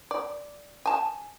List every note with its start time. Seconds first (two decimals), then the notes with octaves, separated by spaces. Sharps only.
0.11 D5
0.86 G#5 A5